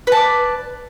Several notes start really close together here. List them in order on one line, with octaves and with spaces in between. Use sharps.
B4 A5 D5